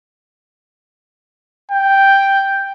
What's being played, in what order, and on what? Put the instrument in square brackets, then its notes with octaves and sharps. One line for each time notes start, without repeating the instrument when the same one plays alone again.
[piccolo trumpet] G5